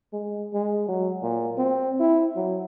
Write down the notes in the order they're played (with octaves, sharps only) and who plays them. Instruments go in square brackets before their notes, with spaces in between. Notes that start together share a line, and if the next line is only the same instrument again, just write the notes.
[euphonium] G#3
G#3
F#3
A#2
C4
E4
F#3